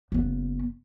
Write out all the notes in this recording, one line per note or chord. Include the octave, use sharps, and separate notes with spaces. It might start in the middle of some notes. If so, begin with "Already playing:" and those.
F#1 B3